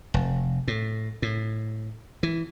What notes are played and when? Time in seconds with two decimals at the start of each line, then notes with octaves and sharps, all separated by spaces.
0.14 F1
0.68 A2
1.22 A2
2.23 E3